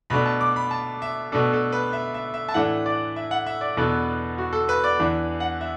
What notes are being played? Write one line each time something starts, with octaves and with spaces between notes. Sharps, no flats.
B2 A3 D4 B5
A5
D6
B5
A5
E5
B2 A3 D4 A4
A4
B4
E5
E5
E5
A5
A2 E3 A3 D4 F#5
D5
E5
F#5
E5
D5
E2 B2 B3 D4 A4
F#4
A4
B4
D5
E2 E3 D4
F#5
E5